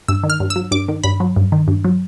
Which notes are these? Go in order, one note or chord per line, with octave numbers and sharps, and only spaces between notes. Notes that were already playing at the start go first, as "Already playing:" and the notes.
G2 E6
D#3
F6
G2
E6
F#3
G2 D6
D#3
G2 B5
F#3
G2
D#3
G2
F#3